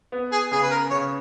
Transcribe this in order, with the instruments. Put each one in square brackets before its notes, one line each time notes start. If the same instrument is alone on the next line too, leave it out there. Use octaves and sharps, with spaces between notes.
[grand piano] B3
[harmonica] G#4
[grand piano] C#3 [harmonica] G#4
[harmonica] B4
A#4
[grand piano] C#3 [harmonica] C#5